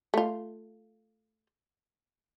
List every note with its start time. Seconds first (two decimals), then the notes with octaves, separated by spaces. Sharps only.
0.14 A3 F4